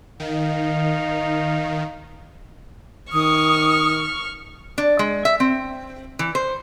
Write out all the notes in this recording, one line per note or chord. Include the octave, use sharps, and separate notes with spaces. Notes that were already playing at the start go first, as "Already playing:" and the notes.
D#3 D#4 F5
D#3 C#6 D#6 F6
D4
G#3
E5
C4
E3
C5